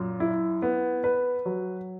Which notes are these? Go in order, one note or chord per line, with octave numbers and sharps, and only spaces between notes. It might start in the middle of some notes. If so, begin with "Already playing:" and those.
Already playing: F#2 A#2
E4
B3
B4
F#3